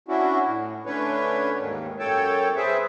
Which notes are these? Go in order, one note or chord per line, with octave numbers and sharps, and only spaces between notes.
C#4 D4 E4 F#4
A2
D3 A3 C#4 D4 B4 C#5
D#2 G#2 D#3
F#2 A4 C#5 G5 A5
G#4 B4 C5 E5